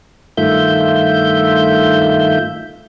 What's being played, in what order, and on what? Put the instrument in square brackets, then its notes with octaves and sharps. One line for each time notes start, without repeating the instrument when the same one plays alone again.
[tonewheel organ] G2 D#3 A3 F4 E5 G6